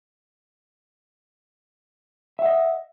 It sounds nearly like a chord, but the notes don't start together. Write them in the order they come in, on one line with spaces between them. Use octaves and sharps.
E5 F#5 D#5